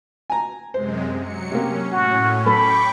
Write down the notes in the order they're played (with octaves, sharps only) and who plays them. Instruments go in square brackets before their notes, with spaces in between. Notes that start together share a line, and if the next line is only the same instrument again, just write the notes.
[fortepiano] G#5 A#5
[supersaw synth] F#2 C3 G#3 [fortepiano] C5
[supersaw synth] F#3 C#7
[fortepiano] C3 A#3 G4 [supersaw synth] C#4
[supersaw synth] A2 C#4 [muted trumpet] F#4
[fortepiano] F#3 A4 [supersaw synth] G5 C#6 D6 [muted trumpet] B5